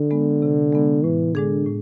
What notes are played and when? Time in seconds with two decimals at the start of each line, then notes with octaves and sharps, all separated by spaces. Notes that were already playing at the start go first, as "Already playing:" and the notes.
Already playing: D3
0.11 G#3 B3
0.42 C3
0.72 G#3 B3
1.04 A2 E3
1.35 D3 G#3 D4 G#4
1.66 A2